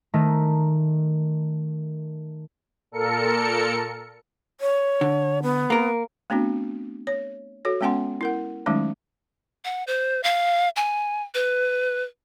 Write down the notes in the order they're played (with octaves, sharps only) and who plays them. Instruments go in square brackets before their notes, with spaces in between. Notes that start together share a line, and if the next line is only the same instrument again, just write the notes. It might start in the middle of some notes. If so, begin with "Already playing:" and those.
[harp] D#3 A3 D#4
[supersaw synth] A#2 A4 A#4 C#7
[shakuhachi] C#5
[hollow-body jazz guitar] D3
[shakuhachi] B3
[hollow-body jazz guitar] A#3 A#4
[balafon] A3 B3 C4 D4 F#4
C#5
F#4 A4 C#5
G#3 B3 C#4 F#5 G#5 C6
E4 A#4 F#5
D#3 F#3 G#3 A3 C#4 D#4
[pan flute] F#5
C5
F5
G#5
B4